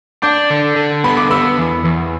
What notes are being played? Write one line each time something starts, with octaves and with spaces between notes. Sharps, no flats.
D4 D6 G6
D3
D3
B3 B5
D6
B3 B5 E6
E2
E2